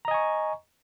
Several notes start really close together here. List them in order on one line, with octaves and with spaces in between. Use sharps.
A#5 D#5 G#5 C#6